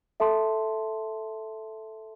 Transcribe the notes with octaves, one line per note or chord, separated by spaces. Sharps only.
A4 E5 A5 C6